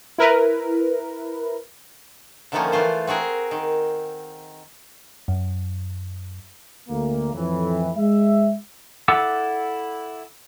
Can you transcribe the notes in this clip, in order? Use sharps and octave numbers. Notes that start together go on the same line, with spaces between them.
E4 A#4 B4
D3 D#3 F3 A3 A#3 C#4
E3 A3 F4 C5
C4 F#4 G#4 A#4
D#3
F#2
D2 A#3
F2 A2 E3
G#3 E5
E4 A4 F#5 D6 E6